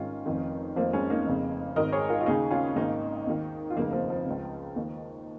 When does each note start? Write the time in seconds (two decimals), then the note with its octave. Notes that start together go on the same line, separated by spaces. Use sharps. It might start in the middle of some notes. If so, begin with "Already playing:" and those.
Already playing: G#1 G#2 D#3 C#4 F4
0.26 F1 F2 D#3
0.76 F1 F2 D#3 F3 A#3
0.93 G#3 C#4
1.10 A#3 D#4
1.26 F1 F2 C#3
1.76 G#1 G#2 D#3 A#4 D#5
1.92 G#4 C#5
2.09 F4 A#4
2.21 F4
2.26 D#2 C#3 D#4 G#4
2.51 C#4 F4
2.76 G#1 G#2 D#3 A#3 D#4
3.27 D#2 D#3
3.70 F4
3.76 F1 D#2 C#3 A#3 D#4
3.93 F3 A#3
4.10 F3
4.26 C#2 C#3
4.76 D#2 D#3